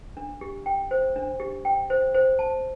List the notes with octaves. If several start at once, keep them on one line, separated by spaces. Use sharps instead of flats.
D4
G4
G5
C5
D4
G4
G5
C5
C5
A5